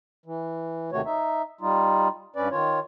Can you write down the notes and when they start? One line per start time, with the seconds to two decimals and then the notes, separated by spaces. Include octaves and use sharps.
0.26 E3
0.92 D#2 C3 D#3 A3 F#4 C#5
1.06 D#4 E5
1.61 G3 D#4 F4
2.36 G2 C#4 B4 D5
2.51 D#3 F4 C#5